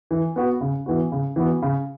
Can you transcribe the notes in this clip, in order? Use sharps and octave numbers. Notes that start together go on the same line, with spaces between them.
E3
B3 F#4
C#3
E3 B3 F#4
C#3
E3 B3 F#4
C#3